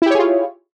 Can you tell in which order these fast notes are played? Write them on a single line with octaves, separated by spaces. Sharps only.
E4 G4 C#5 G#4 F4